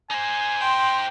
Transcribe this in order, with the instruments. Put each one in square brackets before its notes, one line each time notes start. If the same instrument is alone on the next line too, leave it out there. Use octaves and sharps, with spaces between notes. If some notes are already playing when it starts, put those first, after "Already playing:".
[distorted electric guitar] D#4 C5 [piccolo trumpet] G#5
[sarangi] G5 [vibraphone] C6